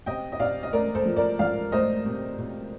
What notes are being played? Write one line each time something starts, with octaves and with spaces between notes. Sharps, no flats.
C3 D#5 G5
D#5
C3 D5 F5
D#5
A3 A#4 D5
A4 C5
F3
A#4 D5
F3 D5 F5
A3 C5 D#5
C3
C3